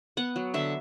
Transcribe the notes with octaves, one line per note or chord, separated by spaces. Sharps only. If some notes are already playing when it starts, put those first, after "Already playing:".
B3 F#5
F#3
D3 E5